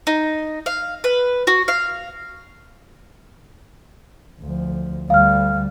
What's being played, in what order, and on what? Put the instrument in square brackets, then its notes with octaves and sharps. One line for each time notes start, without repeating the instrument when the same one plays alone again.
[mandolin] D#4
F5
B4
F#4
F5
[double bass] D2 F3
[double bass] D2 G3 [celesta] F5 F6